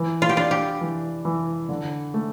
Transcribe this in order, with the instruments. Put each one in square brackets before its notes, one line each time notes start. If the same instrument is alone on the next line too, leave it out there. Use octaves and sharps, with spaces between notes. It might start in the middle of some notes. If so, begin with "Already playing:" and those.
Already playing: [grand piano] E3
[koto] F4
G4
[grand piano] D4 [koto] F4
[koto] G4
[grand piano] E3
E3
D3
A3